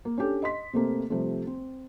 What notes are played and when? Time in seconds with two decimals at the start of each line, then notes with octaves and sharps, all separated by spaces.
0.05 A#3
0.18 C#4 D4 G4 A4
0.43 D#5 C6 B6
0.73 C3 A3 A#3 C4
1.10 C3 F3 G3 A3
1.47 C4